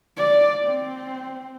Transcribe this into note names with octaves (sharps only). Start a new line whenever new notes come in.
D5
C4